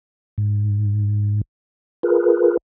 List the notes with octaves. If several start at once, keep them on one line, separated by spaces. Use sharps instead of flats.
G#2
F4 G#4 A#4 B4